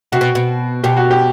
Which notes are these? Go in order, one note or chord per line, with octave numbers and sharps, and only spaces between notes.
C3 F#4
B2
B2
B2 G4
F#4
G4